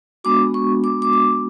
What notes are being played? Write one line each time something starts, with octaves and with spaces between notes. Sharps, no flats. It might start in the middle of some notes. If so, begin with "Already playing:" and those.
G#3 B3 D4 F#4 D6
C#6
D6
D6
D6